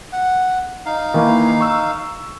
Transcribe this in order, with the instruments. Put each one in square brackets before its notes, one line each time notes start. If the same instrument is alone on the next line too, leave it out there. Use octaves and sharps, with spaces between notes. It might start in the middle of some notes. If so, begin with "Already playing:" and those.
[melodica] F#5
D#4 F5
[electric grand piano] D#3 E3 A#3
C#6 E6